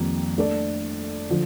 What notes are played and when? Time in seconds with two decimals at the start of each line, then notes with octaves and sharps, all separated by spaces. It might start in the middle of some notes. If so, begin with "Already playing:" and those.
Already playing: F2 D#3 G3 A#3
0.38 A3 D4 A4 D5
1.30 D3 F3